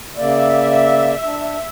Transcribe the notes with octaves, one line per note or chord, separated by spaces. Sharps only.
C#3 A#3 D5 E5
D4